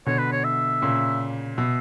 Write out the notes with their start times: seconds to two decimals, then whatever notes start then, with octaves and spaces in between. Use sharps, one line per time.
0.06 B2 D3 C#5
0.19 B4
0.32 C#5
0.44 E5
0.82 A#2 C#3
1.57 B2 E5